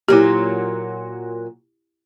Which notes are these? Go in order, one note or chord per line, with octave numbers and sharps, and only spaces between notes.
A#2 F#3 E4 G4